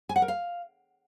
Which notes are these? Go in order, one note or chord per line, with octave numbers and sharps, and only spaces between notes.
G#5
F#5
A#4
F5